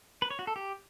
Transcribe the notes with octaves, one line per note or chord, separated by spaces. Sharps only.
B4
C#5
F#4
A4
G4